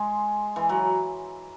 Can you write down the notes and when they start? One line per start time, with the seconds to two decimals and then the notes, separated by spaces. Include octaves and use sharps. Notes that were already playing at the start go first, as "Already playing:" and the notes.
Already playing: G#3
0.56 E3
0.69 F#3